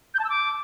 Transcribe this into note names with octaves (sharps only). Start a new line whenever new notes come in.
G6
A5
E6
D6